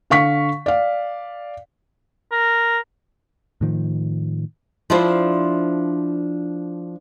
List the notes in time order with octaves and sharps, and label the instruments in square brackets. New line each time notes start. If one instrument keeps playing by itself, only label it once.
[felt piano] D3 F5 C#6 B6
D5 F5
[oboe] A#4
[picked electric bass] A2 D#3 F3
[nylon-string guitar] F3 D4 E4 F4 C5